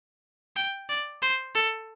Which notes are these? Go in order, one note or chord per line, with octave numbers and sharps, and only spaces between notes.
G5
D5
C5
A4